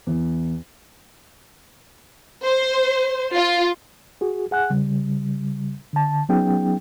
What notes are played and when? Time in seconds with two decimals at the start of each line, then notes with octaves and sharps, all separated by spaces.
0.07 E2
2.45 C5
3.35 F4
4.21 F#4 G#4
4.51 G#4 F#5 G#5 F#6
4.70 C#3 G3
5.93 D3 A5
6.29 F#3 B3 C#4 D#4 G#4 G5